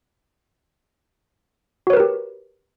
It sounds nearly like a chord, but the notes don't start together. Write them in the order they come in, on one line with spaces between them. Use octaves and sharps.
F#4 C#5 B4 A#4 G4